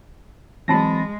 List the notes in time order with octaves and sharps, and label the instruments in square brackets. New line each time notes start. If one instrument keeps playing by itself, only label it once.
[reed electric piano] E3 C4 B5 [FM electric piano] F#3 A5 A#6 [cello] G#3